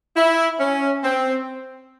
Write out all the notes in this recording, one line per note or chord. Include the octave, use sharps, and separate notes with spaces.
E4
C#4
C4